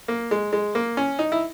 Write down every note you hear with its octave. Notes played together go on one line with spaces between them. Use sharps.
A#3
G#3
G#3
A#3
C#4
D#4
E4